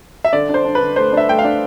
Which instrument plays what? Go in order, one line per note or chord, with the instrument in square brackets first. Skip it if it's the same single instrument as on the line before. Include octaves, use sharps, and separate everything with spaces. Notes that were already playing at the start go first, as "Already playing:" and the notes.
[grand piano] E5
D3 D5
D4
C5
D4
B4
D3
A3 C5
D4
E5
A3 G5
F5
D4